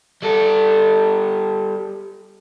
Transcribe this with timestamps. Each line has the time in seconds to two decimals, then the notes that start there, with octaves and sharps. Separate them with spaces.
0.22 G3 A4